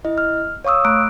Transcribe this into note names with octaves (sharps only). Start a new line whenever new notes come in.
E4 D#5
F6
C#5 F5 C#6 D#6 E6
A3 A#5 D6 F#6 D7